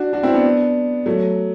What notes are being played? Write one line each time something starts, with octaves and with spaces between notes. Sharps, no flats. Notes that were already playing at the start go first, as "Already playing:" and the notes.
Already playing: D4 F#4
D4 F#4
C4 E4
B3 D4
F#3 A3